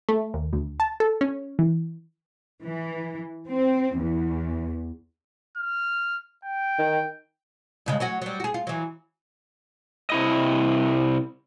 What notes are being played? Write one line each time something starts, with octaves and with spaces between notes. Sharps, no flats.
A3
D#2
D2
A5
A4
C#4
E3
E3
C4
E2
F6
G5
D#3
G2 C#3 G#3
F#3 C#4 F#4
F#3 G3
F#4 G#4
F4
E3 F#3
C3 E4 D#5